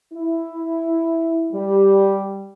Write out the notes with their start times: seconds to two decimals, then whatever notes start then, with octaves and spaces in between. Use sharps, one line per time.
0.13 E4
1.53 G3